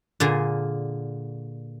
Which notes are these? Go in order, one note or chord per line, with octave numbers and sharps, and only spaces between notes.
A#2 D3 A#3 G#4